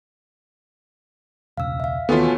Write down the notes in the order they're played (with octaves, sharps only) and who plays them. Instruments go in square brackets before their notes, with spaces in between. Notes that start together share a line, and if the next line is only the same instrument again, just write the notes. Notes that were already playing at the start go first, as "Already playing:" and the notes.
[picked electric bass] E1 C#2 [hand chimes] F5 E6
[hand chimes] E5 F5
[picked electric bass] D#2 [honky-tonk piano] B2 E3 A3 [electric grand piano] B3 F4 [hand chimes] A4 C#5